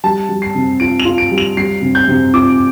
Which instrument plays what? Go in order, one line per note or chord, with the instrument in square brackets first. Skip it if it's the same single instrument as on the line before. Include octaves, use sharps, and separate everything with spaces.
[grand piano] G3 [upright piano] A5
[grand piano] G3
[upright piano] C7
[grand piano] C3
[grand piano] F4 [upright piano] D7
[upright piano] F7
[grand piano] F4
[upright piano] D7
[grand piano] G3
[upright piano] F7
[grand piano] G3 [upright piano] C7
[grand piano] C3
[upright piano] G6
[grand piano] C3
[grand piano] F4 [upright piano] D6